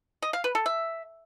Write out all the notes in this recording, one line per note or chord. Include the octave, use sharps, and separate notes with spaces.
D#5
F5
B4
A4
E5